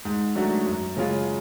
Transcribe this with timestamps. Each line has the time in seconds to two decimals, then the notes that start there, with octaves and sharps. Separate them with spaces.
0.05 G#2
0.35 F#3 A3 D4 F#4
0.66 F#2
0.97 C#3 G#3 C#4 F4